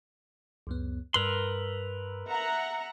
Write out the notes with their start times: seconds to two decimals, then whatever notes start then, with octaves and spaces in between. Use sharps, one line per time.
0.67 C#2 F#2 B3
1.14 G2 A#4 B4 C6 E6
2.29 E5 F#5 A#5